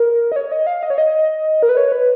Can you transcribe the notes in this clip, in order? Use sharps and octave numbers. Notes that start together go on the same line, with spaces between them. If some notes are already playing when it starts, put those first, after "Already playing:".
Already playing: A#4
D#5
C#5
D#5
F5
D#5
C#5
D#5
A#4
B4
C#5
B4